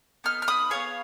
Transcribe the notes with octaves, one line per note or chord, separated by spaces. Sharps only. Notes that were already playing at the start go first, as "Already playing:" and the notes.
B3 D#4 F6
F6
B5 D#6
B3 F4 G#4 C#5 F5